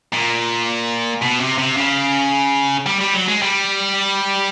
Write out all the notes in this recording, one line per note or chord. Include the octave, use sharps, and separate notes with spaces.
A#2
B2
C3
C3
C#3
G3
G3
F#3
G#3
G3